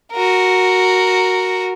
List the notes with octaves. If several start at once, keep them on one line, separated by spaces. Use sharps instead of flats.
F#4 A#4